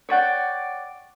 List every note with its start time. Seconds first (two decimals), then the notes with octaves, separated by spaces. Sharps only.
0.09 C#5 D5 F#5 G5